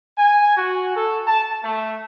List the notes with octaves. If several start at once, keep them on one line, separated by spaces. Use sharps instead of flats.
G#5
F#4
A4
A5
A3